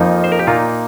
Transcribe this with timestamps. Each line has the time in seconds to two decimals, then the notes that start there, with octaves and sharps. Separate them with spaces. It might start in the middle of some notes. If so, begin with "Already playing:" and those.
Already playing: F2 F3 A#3 D#4
0.24 C5
0.32 A#4
0.39 G4
0.47 A#2 A#3 D#4 F4